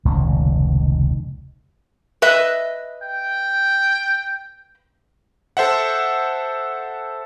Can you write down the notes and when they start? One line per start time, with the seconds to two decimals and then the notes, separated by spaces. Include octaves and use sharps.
0.05 F1 C#2 A#2 D#3
2.22 B4 D#5 E5
3.03 G5
5.57 A4 C5 E5 F#5